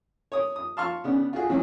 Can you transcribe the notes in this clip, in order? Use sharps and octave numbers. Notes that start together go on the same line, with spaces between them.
C#5 D#6
D#6
F5 A5 C6 C#6 F6
C#3 B3 D4
F4 F#4 G#4
E3 F#3 C4 C#4 D#4